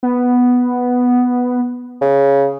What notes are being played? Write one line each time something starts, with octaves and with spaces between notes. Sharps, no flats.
B3
C#3